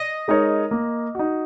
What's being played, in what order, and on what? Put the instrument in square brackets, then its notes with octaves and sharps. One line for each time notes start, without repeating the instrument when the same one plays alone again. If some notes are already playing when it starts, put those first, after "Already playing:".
Already playing: [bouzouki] D#5
[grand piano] G#3 D#4 A#4 C#5
A#3
D#4 F#4